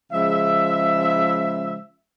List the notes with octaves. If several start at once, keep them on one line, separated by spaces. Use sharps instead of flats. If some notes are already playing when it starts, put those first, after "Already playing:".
C#3 F3 G#3 E5